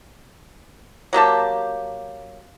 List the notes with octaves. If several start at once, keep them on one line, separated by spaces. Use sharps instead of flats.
F#3 A#3 G4 A5